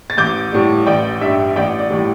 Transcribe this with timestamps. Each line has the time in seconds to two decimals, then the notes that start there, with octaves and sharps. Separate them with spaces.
0.10 A6
0.17 A1 D6 G6
0.52 A2 G3
0.86 A1 D5 G5
1.21 G2 G3 E5
1.56 A1 D5 G5
1.79 D5
1.90 A2 E3 G3